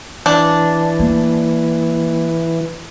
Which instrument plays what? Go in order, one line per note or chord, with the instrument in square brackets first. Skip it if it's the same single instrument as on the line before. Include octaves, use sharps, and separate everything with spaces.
[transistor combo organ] E3 [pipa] D4
[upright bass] A#3